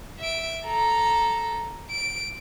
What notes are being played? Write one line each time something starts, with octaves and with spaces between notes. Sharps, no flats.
E5 D7
A4 A#5
D7